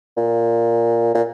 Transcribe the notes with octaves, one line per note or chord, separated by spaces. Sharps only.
A#2
A#2